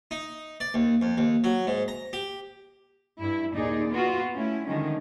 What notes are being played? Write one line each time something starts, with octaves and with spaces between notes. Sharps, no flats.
D#4
D5
D#2
F2
D#2
F#3
G#2
A#5
G4
G2 E4
D#2 A#2 D#4 G#4 D5
B3 F4 F#4
A3 C#4 E4
D3 D#3 F3 G3 G#3 C#4